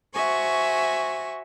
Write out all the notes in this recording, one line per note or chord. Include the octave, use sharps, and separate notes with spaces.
F#4 C5 E5 G#5 C#6